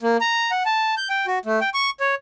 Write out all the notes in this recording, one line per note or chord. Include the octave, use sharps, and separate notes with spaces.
A#3
A#5
F#5
A5
G6
G5
F#4
A3
G5
C#6
C#5